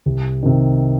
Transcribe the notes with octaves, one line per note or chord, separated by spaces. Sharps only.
C2
C3 D#3